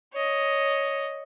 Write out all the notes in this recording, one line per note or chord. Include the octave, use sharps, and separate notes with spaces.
C#5 D#5